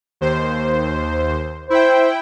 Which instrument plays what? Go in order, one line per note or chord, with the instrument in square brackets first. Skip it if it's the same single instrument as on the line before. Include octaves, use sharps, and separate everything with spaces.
[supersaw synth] D#2 C5
[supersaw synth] E4 G5 [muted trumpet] C5